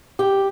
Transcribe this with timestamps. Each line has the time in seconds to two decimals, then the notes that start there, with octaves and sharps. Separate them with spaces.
0.19 G4